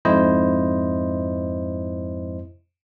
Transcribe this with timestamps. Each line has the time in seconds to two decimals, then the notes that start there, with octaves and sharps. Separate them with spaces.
0.05 F2 G#2 E4 C5 D#5